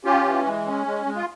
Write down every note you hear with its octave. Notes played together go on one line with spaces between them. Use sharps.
C#4 F4 G4
E3
G#3
C#4
G#3
G#3
F4